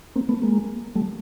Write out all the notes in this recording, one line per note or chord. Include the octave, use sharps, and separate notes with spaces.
A#3 C4
A3 B3
G#3 A#3
G3 A3